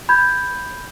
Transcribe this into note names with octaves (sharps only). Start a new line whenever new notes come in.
B5 G6 G#6